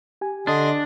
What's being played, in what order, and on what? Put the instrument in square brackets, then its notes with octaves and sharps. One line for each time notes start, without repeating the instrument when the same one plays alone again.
[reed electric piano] G4 G#5
[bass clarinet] D3 [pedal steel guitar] D4 [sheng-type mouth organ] D#5 C6 D#6